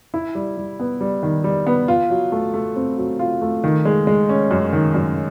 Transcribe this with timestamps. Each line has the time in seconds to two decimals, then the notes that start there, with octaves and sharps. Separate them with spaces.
0.14 E4
0.35 G3
0.57 G3
0.80 B3
1.01 G3
1.23 D#3
1.44 G3
1.67 B3
1.88 F4
2.10 F#3
2.32 A3
2.54 A3
2.76 C4
2.97 F#3
3.19 F4
3.41 A3
3.64 D#3
3.85 G#3
4.07 G#3
4.29 C#4
4.51 F#2
4.73 D#3
4.95 F#2